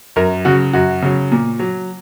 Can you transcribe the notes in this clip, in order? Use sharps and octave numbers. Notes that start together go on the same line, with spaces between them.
F#2 A#4
C#3 F#3 F#4
F#2 F#4
C#3 F#3
A#2
F#3